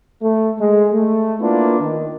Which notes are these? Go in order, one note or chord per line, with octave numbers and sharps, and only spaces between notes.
A3
G#3
A3
A#3 B3 D4 E4 F4
D#3